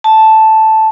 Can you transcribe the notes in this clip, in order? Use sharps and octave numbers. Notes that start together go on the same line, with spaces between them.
A5